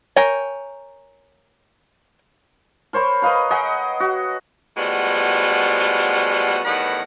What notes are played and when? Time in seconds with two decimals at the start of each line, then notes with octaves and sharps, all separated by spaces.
0.16 A#4 C#5 G5 G#5
2.93 A#4 C5 C#5 B5
3.22 B4 D#5 F5 A#5
3.51 G#4 D#5 F#5 G5
4.00 F#4
4.76 A2 F3 G3 G#3 B3 F#4
6.65 E2 A2 D#3 G3 B4 F#5